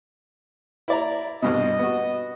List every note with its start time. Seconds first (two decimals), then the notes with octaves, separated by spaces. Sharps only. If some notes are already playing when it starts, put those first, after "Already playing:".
0.88 E4 D5 A#5
1.42 C2 G2 B2 D#5
1.79 B3 F#4